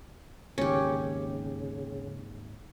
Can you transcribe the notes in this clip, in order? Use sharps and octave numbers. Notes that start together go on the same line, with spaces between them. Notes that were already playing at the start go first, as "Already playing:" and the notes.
G#1 D#2 C#3 C#4 G4